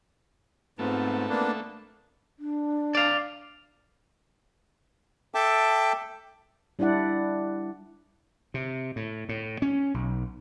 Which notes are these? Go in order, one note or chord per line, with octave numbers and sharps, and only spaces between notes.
G#2 A3 B3 C4 F4
A#3 B3 D4
D4
D5 F5
A4 E5 G5 A5 D6
G3 D4 E4 D5 F#5
C3
A2
A2
C#4
B1